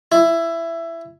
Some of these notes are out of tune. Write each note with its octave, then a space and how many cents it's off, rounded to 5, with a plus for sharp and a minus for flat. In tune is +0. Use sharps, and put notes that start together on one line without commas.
E4 +15